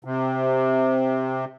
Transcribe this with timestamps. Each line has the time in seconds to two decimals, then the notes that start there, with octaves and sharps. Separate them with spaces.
0.04 C3